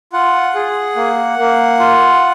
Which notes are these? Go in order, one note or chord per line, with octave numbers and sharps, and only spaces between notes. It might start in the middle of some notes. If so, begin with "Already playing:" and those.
F4 F#5
G#4
A#3
A#3
F4